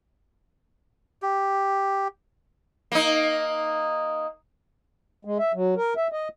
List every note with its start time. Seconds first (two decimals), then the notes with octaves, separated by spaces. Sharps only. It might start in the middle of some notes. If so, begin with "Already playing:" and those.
1.22 G4
2.92 A#3 D#4
5.25 G#3
5.39 E5
5.54 F#3
5.77 A#4
5.97 E5
6.12 D#5